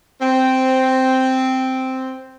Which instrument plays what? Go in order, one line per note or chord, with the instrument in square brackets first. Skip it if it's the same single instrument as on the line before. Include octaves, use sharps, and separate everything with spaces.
[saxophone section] C4